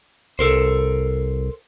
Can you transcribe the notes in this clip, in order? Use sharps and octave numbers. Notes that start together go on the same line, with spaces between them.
C2 A4 A#4 C5